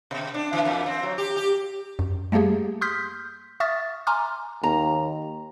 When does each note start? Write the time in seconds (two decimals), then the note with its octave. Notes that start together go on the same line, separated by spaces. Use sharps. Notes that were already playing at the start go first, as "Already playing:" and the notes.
0.11 B2
0.34 D4
0.53 E3
0.65 E2
0.86 C4
1.03 F#3
1.18 G4
1.36 G4
1.99 F#2
2.32 G3 A3 A#3 G4 G#4
2.81 C6 D#6 F6 G6 B6
3.60 E5 C#6 D#6 F6 A6
4.07 G#5 A#5 C6 D6 F6
4.63 D#2 A#5